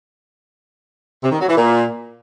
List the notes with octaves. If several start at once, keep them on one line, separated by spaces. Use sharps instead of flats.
C3
D#3
F#3
E3
A#2